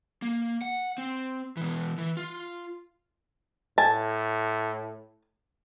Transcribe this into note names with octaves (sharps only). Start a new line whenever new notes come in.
A#3
F#5
C4
B2 E3
E3
F4
A2 G#5 A5